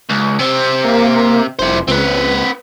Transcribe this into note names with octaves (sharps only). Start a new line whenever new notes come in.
C#2
C3 C4
A#3
F1 E4 C5
C#2 C4 B4